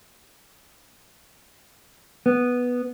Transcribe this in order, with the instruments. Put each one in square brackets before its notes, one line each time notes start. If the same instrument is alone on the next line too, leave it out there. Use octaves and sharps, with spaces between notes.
[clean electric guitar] B3